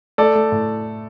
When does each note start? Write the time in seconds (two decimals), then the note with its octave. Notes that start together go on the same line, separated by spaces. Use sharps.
0.18 A3 A4 D5
0.35 A3
0.52 A2